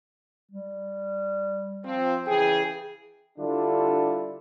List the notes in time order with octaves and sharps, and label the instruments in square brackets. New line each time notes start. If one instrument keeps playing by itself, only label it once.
[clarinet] G3
[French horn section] F3 C4
[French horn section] C#3 E3 G#4 [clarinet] G5
[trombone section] D3 G3 D4 E4 F4 A4